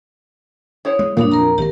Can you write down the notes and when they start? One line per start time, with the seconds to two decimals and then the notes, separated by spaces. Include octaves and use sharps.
0.85 E4 C5 C#5 D#6
0.99 G#3
1.17 G2 A#2 E3 F#3 D4 B5 D#6
1.31 F2 A#4 A#5
1.58 G#1 G4 A#4